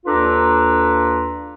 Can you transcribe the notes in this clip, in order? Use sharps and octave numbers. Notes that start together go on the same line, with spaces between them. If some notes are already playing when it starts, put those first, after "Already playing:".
D#2 D4 F4 A4 B4 A#5